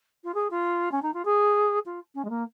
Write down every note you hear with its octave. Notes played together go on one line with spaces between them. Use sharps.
F4
G#4
F4
C#4
D#4
F4
G#4
F4
C#4
G#3
A#3